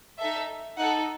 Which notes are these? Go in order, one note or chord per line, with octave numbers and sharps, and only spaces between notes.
D#4 A4 E5
D#4 A4 F#5